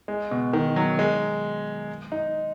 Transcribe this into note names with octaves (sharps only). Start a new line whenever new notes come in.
G#3
B2
D#3
F#3
G#3
D#4